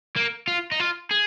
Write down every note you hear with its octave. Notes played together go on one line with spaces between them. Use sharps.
A#3
F4
D#4
F4
G#4